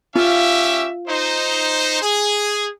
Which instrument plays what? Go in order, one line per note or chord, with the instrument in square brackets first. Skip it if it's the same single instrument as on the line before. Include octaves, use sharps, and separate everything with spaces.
[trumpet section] C#4 G4 E5 [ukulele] F4
[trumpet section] D#4 C5
G#4